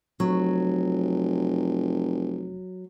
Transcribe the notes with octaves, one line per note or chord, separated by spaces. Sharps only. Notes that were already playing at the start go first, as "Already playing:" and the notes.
F1 F#3